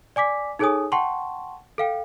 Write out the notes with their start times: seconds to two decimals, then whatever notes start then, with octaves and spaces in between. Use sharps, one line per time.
0.16 D5 G#5 D6 B6
0.59 D#4 G#4 A4 C#5 G#5 D#6
0.92 F#5 G5 A5 C6 C#6
1.78 A4 F5 G5